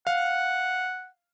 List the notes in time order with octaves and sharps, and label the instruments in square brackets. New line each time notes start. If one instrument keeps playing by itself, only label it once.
[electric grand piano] F5 [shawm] F#5